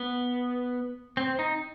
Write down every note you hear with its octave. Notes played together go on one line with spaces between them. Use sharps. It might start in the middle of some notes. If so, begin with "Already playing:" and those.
Already playing: B3
C4
D#4